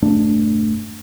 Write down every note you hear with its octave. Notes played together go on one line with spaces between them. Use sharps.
E1 G2 A3 D4